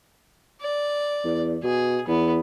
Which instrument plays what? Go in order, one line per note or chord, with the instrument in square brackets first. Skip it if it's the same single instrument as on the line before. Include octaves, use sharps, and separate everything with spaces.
[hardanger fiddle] D5
[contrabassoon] E2
[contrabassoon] B2 [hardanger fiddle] G#4
[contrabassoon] E2 [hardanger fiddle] B3